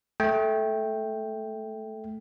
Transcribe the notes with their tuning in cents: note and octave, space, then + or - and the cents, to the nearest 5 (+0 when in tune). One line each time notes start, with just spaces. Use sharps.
A3 -10 G5 +0